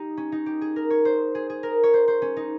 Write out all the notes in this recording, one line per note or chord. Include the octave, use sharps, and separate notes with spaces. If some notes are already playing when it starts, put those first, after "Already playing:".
Already playing: D#4 G4
C#4
D#4
G4
G#4
A#4
C#5
C5
G#4
G#4
A#4
C#5
C5
C5
C#4
D#4